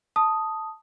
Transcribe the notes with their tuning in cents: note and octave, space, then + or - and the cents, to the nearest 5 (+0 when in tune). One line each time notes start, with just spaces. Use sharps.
A5 +0 D#6 +0